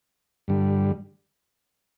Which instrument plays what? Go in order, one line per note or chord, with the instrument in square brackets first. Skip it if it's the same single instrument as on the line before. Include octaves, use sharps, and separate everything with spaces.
[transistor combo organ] G2 D3 G3